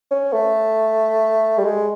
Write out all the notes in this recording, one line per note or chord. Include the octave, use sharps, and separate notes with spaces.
C#4
A3
G3
G#3